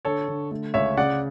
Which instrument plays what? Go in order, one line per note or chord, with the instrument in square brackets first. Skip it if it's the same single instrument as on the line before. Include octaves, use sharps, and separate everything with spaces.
[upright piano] D3 [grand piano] A4 C#5
[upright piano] D3
A3
[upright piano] C#2 [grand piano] C#5 E5
[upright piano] C#3 [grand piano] D5 F#5